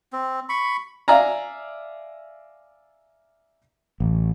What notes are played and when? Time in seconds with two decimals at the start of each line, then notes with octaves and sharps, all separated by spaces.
0.13 C4
0.49 B5 C#6
1.08 D5 E5 F5 G#5 A#5
4.00 A1